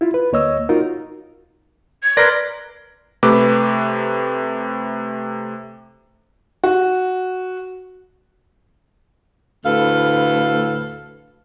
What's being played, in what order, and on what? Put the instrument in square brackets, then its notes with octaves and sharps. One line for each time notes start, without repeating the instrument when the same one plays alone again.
[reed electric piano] E4 F4
B4
D2 A#3 C#5 D#5 E6
D#4 F4 F#4 A#4
[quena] G#6
[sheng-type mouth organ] A#4 B4 C6 [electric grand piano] D5 A#6
[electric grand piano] C3 A3 B4 D6
[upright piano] F#4
[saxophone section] D2 A2 A4 B4 F5